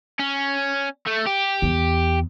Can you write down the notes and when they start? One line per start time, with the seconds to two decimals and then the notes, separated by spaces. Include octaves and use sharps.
0.20 C#4
1.07 A3
1.27 G4
1.62 E2